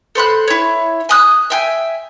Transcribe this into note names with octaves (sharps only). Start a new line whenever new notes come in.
A4 C5 B5 F#6
E4 C#5
G#5 D#6 F#6
E5 G5 G#5